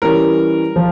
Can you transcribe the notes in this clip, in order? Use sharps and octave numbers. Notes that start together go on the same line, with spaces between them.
E3 G3 C#4 A#4
F3